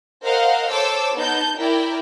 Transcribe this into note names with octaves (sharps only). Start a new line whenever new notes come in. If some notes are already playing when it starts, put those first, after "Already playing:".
A#4 C5 D#5 F5 F#5
A4 C5 C#5 D6 E6
B3 D#4 A5 G6
E4 A#4 D5 G5